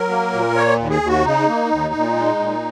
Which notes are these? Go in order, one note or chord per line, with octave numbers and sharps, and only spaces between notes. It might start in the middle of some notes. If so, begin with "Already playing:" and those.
Already playing: F#3 A#4
A#3
A#2
A#3 C#5
D#2
G#4
D#2
F#4
C#3 D#4
A#3
D#2
A#2
G#3
A#2